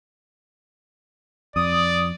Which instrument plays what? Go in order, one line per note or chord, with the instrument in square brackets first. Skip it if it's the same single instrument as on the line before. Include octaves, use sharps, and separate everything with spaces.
[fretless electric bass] F2 [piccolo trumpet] D5 [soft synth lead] D#6